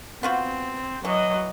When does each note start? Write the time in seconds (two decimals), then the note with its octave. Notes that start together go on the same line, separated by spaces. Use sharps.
0.23 B3 C4 F4 F#4
1.05 E3 F#3 D#5